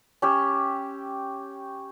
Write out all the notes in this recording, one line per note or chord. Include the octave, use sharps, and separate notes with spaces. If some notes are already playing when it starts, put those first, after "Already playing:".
C#4 G4 E6